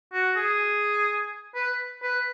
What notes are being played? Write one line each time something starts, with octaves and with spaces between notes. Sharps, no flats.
F#4
G#4
B4
B4